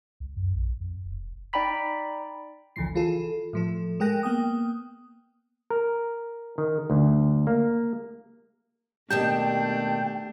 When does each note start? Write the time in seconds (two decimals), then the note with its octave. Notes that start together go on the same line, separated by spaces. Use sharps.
0.20 C#2
0.36 F#2
0.53 A#1
0.80 F2
1.05 E1
1.53 D#4 D5 G5 A#5 B5 B6
2.76 G#1 D2 C#3 E3 F3 C7
2.95 E3 F4 G#4 A4
3.53 A2 F3 A4
4.00 G#3 G#4 A#4 G5 F#6 A#6
4.23 A#3 B3 G5 D#6
5.70 A#4
6.58 D#3
6.90 D2
7.47 A#3
9.10 D#2 B2 A3 D4 G4 G5 A5